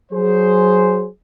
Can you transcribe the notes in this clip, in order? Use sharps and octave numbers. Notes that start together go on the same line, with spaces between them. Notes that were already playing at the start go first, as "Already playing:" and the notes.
F#3 G#4 C5